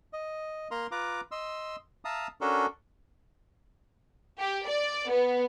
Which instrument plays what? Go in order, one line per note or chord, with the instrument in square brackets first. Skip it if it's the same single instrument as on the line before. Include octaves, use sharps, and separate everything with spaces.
[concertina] D#5
A#3 A#4 A#5 C6
F4 B4 A#5 D6
D#5 C6 E6
E5 F5 A5 A#5 D#6
C#4 D4 F#4 A4 A#4
[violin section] G4
D5
B3